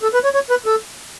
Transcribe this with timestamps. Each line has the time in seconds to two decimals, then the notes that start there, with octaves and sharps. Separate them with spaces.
0.03 A4
0.14 B4
0.24 C#5
0.34 C#5
0.50 B4
0.66 A4